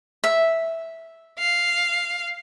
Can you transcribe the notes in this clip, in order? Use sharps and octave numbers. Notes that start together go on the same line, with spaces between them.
E5
F5